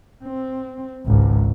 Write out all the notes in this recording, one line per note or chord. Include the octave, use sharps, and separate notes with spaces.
C4
G#1 C#2